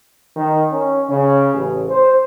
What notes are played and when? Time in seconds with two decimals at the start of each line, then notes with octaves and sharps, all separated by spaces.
0.36 D#3
0.72 C#4
1.09 C#3
1.54 A1
1.90 C5